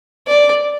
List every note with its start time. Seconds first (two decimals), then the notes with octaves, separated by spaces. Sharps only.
0.27 D5